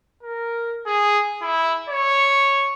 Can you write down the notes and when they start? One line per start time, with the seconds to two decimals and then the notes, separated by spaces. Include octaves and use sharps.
0.23 A#4
0.86 G#4
1.42 E4
1.89 C#5